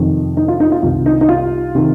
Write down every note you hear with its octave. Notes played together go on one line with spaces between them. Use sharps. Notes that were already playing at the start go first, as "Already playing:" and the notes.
Already playing: F2 C3 D#3
D#4
F4
D#4
F4
C2 C3 D#3 F4
D#4
D#4
F4
C3 D#3